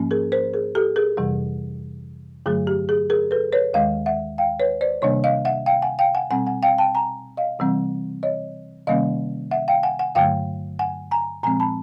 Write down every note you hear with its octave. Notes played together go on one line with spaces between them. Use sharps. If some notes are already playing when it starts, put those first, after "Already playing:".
Already playing: G#2 F3 A#3 C#4
G#4 A#4
A#4 C5
G#4 A#4
G4 A4
G#4 A#4
F2 C3 E3 G3
G2 D3 F#3 A3 G#4
G4
G#4
G#4 A#4
A4 B4
B4 C#5
D#2 D#3 G#3 D#5 F5
E5 F#5
F5 G5
B4 C#5
C5 D5
C3 D#3 G3 A#3 D4 C#5 D#5
D#5 F5
E5 F#5
F5 G5
F#5 G#5
F5 G5
F#5 G#5
B2 G3 C4 F#5 G#5
F#5 G#5
F5 G5
G5 A5
G#5 A#5
D#5 F5
C3 E3 G3 C4
C#5 D#5
C3 D#3 G3 A#3 C#4 D#5 F5
E5 F#5
F5 G5
F#5 G#5
F#5 G#5
G2 D3 F#3 A3 F5 G5
F#5 G#5
G#5 A#5
A#2 F3 G#3 C4 G#5 A#5
A5 B5